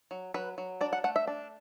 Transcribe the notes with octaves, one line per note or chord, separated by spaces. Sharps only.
F#3
F#3 B4
F#3
D4 D5
F#5
A3 F#5
E5
D4